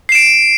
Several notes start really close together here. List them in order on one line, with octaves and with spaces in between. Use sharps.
C7 E7 D7